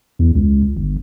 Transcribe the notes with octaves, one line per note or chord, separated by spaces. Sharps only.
E2
C#2
G1